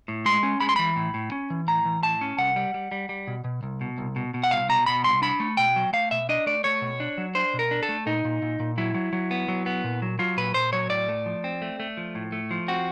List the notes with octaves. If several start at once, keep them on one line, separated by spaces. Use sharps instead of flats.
A2
G#3 C6
C#4
G#3 B5
C6
E3 B5
A2
A2
C#4
E3
A2 A#5
E3
A2 A5
C#4
C2 F#5
G3
G3
G3
G3
B2
B2
C2
B2
C2
B2
B2
F#5
C2 F5
B2 A#5
B2 B5
C2 C6
D4 B5
A3
B2 G5
F#3
A3 F5
B2 E5
D4 D#5
A3 D5
A3 C#5
B2
D4
F#3
D4 C5
B2
A#4
D4
A4
A3
A#2 D#4
A#2
A#2
A#2
F#3 E4
F#3
F#3
B3
F#3
B3
A#2
F#3
F#3 F4
A#2 B4
A#2 C5
F#3 C#5
A2 D5
A3
F3
C4
A3
A3
F3
A2
A3
F3
C4 F#4